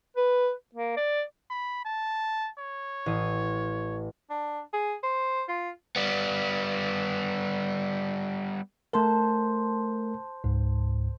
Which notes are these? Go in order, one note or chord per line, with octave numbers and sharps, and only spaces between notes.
B4
A#3
D5
B5
A5
C#5
A1 D#6
D4
G#4
C5
F4
G3 B3
A3 A#4 C5 A5
C#2 G#2